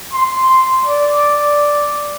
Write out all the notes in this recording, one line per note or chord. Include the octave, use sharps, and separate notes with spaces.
C6
D5